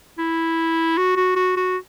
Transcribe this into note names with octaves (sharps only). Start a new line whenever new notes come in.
E4
F#4
F#4
F#4
F#4